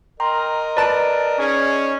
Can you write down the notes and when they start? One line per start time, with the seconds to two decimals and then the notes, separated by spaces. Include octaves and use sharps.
0.20 A#4 D#5 G5 A#5 C6
0.77 B4 D5 A5 D7
1.39 C#4 D#4 G#4